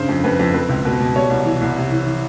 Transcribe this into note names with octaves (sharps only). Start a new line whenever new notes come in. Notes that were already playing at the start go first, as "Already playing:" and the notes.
Already playing: G2 C#3 C5
F2
F2 B4
F2
C4 B4
C#2
B2 B4
B2
G3 C#5
C2
E3
C2
C3
E3
E3